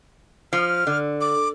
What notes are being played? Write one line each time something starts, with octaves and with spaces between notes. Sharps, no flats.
F3 F6
D3
D6